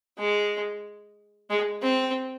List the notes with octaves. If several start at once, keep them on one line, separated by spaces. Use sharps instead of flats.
G#3
G#3
C4